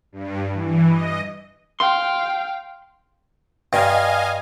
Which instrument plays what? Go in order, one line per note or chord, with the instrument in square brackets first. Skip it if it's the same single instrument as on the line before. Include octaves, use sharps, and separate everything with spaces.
[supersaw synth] G2
E3
D#5
[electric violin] F5 G5 [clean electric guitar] C6
[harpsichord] G2 [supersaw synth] D#5 F5 G#5